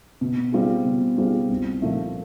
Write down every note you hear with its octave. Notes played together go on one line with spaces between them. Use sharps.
B2
G3 C4 F4 G#4
B2
G3 C4 F4 G#4
C2
A#2 F3 A3